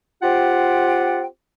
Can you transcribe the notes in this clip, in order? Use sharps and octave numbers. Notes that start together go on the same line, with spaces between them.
C4 F4 G4 F#5 G5